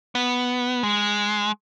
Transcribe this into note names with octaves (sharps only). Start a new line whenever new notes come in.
B3
G#3